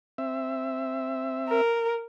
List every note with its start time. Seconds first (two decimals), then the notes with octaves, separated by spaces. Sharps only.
0.18 C4 E5
1.49 A#4